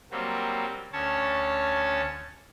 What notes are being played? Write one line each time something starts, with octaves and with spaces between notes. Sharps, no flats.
F#3 G3 A#3 C4
D2 C#4 C#5 A5